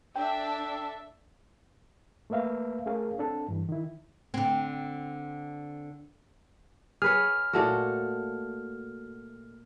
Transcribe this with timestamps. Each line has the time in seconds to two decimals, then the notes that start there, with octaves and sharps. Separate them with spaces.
0.16 D4 A4 E5 G5
2.30 A3 A#3 B4 E5 F5
2.86 A3 C#4 G#4 A#4 F5
3.18 C4 D4 A4
3.48 G2 E3
3.69 D#3 E4
4.34 D3 C4
7.02 G#4 B4 C#5 F6
7.53 A#2 A3 F#4